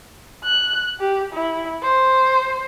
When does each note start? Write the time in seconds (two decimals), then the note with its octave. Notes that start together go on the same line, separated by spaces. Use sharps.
0.45 F#6
1.00 G4
1.33 E4
1.83 C5